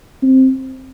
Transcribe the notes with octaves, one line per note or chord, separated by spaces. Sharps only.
C4